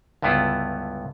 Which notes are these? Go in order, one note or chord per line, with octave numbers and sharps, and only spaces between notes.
C#2 G2 D3 B3 E4 F4